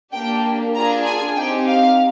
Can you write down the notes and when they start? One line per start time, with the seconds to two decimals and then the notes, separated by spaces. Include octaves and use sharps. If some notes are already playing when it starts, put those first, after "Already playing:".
0.12 A#3 D4 G4 G5
0.75 D4 F4 G#4 A#5
1.06 G#5
1.36 C4 D#4 G4 G5
1.67 F5